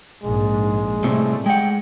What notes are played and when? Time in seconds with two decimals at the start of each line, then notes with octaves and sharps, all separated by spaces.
0.23 A#1 G#2 G#3
1.04 A2 C3 G3 A3 C4
1.46 G#3 F#5 G5